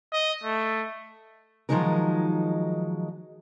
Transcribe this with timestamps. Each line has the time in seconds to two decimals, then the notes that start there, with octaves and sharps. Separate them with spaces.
0.13 D#5
0.43 A3
1.69 D#3 F3 F#3 G#3 D#4 A#4